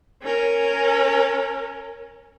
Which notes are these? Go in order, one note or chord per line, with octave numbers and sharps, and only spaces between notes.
C#4 A#4